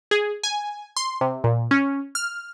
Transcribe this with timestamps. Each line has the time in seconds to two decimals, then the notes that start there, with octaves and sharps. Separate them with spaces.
0.11 G#4
0.44 G#5
0.97 C6
1.21 C3
1.44 A#2
1.71 C#4
2.15 F6